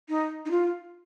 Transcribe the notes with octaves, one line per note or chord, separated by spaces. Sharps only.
D#4
D#4
F4